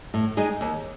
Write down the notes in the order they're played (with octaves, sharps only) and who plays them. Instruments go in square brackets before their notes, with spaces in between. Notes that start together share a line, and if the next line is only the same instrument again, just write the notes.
[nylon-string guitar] A2
G#3 D#4 G#4
D#2